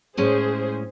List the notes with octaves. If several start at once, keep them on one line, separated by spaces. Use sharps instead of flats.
A2 G#3 C#4 G#4 C5